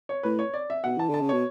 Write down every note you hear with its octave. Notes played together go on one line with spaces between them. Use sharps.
C#5
A2 B4
C#5
D5
E5
B2 F#5
E3 A5
D3 A5
C#3
B2 C#5